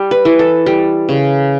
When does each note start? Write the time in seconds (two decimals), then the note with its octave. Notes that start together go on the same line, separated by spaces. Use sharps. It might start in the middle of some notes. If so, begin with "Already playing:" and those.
Already playing: G3
0.11 B4
0.25 E3
0.39 A4
0.66 G3
1.09 C#3